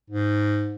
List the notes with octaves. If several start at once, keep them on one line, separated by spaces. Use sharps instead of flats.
G#2